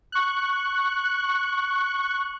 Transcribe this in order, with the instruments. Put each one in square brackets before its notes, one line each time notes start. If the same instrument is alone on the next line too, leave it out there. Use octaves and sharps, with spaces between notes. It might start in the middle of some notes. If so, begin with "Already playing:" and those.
[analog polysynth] C#6 F#6